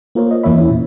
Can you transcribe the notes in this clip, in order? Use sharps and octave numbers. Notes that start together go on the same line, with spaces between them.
A#3 F4 A#4 C5 C#5
D#5
E2 E3 A#3 C#5 E5 B5
C#4 E4
A#2